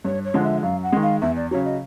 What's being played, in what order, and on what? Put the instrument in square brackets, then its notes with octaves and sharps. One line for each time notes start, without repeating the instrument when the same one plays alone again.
[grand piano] G2 [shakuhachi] C#5
[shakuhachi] C#5
[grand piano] D3 F3 G#3
[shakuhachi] E5
[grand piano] F#2 [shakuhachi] F5
[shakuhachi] F#5
[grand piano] D#3 G#3
[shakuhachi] F5
[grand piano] E2 [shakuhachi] E5
[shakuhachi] D5
[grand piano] C#3 F#3 [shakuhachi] C#5
[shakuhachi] D#5